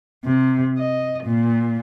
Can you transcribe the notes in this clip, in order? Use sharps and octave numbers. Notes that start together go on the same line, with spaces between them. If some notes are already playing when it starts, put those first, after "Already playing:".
C3
D#5
A#2